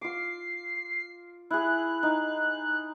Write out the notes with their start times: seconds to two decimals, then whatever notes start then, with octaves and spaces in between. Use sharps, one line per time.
0.01 F4 D6 C7
1.51 E4 G#4 F#6
2.03 D#4